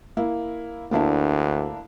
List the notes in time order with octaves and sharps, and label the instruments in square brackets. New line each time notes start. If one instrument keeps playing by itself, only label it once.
[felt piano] A#3 E4
[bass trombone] D2 [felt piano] A#3 D4 E4